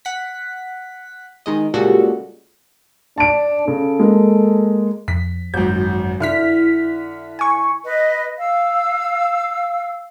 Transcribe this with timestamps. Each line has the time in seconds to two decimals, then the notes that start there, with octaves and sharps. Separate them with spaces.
0.05 F#5 B6
1.46 D#3 G#3 D#5
1.74 A#2 C#3 G3 G#3 F#4 A4
3.18 D4 A5 D7
3.68 C#3 A4
3.99 G#3 A#3
5.08 F2 B6
5.54 G#1 F#2 G6
6.20 D3 E4 F6 B6
7.39 G#5 C#6
7.84 B4 D#5
8.38 F5 E6